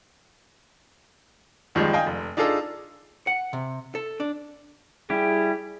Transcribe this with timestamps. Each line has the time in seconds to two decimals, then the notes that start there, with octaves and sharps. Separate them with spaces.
1.75 A1 D#2 D#3 F3 G3 G#3
1.93 D#5 F5 G5 G#5
2.06 F1
2.37 D4 D#4 F4 G#4 A4
3.27 F#5
3.53 C3
3.95 A4
4.20 D4
5.10 G3 E4 G4 G#4